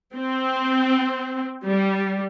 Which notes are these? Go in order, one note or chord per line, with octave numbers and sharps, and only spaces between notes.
C4
G3